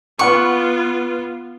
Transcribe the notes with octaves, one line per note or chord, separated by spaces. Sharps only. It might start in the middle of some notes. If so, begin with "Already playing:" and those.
B3 F4 B4 F#5 C#6 D6